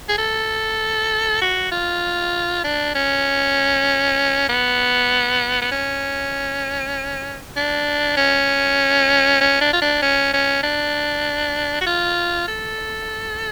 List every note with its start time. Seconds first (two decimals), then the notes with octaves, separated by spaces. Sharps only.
0.09 G#4
0.18 A4
1.41 F#4
1.72 F4
2.64 D4
2.95 C#4
4.49 B3
5.62 B3
5.71 C#4
7.56 D4
8.17 C#4
9.41 C#4
9.61 D4
9.73 F4
9.82 D4
10.02 C#4
10.33 C#4
10.63 D4
11.81 F#4
11.86 F4
12.48 A4